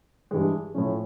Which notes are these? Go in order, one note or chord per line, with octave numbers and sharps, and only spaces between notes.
G2 E3 G#3
A2 F3 A3 C#4